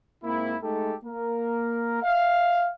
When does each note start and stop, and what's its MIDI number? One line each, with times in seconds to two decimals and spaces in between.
0.24 0.57 44
0.24 0.57 58
0.24 0.57 60
0.24 0.57 64
0.63 0.94 56
0.63 0.94 57
0.63 0.94 63
0.63 0.94 67
0.63 0.94 69
1.04 2.02 58
1.04 2.02 70
2.03 2.70 76
2.03 2.70 77